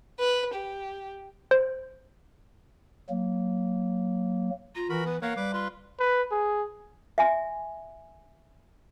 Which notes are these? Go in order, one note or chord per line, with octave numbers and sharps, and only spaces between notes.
B4
G4
C5
F#3 A#3
F4 A#5
E3 F#4 A#4 B5
B3 B4
A#3 A#4 C#5 F5 F#5
G3 B4 D6
F4 B4 C6
B4
G#4
E5 G#5 C6